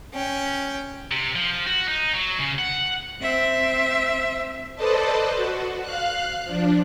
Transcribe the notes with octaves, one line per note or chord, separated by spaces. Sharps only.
C#4 G5
C3
F3
F#4
D#4
F#3
C#3
F#5
C4 E5
A4 B4 C5 D5 D#5 A5
F#4
F5 F#6
F3 D4